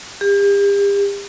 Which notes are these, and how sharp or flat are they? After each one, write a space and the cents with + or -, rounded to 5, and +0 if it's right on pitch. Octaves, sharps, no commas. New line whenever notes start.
G4 +40